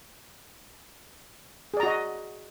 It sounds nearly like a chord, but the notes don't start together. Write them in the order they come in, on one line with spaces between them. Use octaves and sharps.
G#4 D5 A#5 F#4 D#5